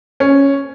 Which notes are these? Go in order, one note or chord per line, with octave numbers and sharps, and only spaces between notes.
C#4